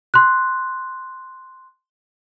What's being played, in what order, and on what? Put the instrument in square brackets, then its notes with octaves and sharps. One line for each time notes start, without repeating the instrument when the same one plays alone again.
[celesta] C6 F#6